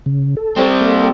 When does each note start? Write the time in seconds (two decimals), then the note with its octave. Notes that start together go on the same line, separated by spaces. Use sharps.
0.06 C#3
0.37 A4
0.57 G3 C4
0.81 A#3 A4